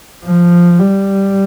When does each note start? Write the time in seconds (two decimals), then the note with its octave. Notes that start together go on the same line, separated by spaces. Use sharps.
0.25 F3
0.79 G3